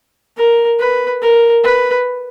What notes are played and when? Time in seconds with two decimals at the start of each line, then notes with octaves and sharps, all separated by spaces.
0.37 A#4
0.79 B4
1.22 A#4
1.64 B4